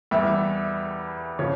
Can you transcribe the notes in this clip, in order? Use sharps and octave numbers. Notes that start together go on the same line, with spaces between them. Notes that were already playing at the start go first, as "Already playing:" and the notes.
E2 E3 G3 E5
C#3 F3 C#5